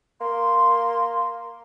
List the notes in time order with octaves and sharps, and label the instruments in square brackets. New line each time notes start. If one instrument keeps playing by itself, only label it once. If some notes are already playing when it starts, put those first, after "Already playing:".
[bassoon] A#3 [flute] C6